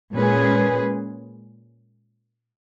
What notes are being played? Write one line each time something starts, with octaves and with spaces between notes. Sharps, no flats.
A#2 G#3 C#4 G#4 B4